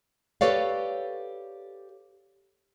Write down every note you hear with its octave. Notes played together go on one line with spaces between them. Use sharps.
G4 A4 B4 C#5 D5 F5